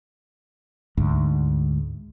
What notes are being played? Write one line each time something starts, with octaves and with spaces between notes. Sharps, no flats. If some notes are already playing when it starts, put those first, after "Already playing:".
D2 G#2